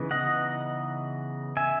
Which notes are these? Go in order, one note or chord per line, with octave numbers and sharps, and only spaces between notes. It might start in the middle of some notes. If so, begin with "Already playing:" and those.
Already playing: C#3 E3 B3 D#4
D#5 F#5
E5 G#5